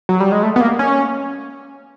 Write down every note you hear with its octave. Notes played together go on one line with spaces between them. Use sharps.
F#3
G3
G#3
A3
B3
A#3
C#4